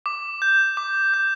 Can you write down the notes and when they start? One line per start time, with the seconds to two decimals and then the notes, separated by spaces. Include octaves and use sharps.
0.06 D6
0.42 G6
0.77 D6
1.14 G6